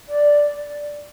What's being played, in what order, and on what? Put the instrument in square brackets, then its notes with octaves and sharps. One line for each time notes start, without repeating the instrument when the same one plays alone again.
[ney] D5